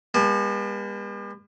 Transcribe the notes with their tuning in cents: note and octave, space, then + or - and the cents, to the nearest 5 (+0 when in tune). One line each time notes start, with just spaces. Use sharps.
G3 +45 B3 -40 A5 -25